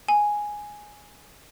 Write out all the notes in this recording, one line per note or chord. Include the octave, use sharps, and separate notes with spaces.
G#5